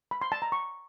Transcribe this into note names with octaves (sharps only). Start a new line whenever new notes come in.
B5
C6
A5
A#5
C#6